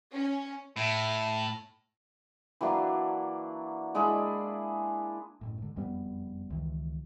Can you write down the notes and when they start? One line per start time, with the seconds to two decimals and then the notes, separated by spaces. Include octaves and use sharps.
0.13 C#4
0.77 A2
2.61 E3 F#3 A#3 D4
3.95 G#3 D4 E4 G#4
5.41 F#1 A2
5.58 G#2 D3
5.76 F#1 F2 G3 B3
6.50 C#2 D#3 E3